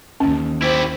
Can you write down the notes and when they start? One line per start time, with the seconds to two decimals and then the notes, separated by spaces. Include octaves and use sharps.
0.20 D#2 C#4
0.62 E4 G4 C5